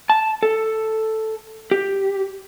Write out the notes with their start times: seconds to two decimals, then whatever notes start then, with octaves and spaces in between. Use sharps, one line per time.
0.10 A5
0.43 A4
1.71 G4